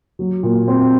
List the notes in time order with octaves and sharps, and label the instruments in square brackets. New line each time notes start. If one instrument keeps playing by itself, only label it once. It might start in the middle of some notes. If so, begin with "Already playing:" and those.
[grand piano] F#3
A#2
C4